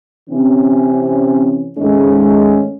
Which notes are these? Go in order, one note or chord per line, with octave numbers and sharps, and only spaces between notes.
C3 E3 C4 C#4
G#2 D#3 G#3 A3 C#4